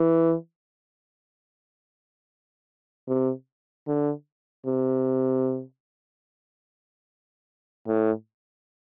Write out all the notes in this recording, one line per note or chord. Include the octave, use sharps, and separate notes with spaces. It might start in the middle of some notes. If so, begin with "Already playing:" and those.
Already playing: E3
C3
D3
C3
A2